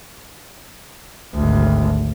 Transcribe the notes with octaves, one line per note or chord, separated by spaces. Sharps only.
G#1 D2